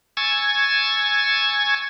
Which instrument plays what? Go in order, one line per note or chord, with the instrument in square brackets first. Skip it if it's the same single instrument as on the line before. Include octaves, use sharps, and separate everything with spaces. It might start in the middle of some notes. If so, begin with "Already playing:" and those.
[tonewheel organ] G#5 C#6 E6 G#6 A6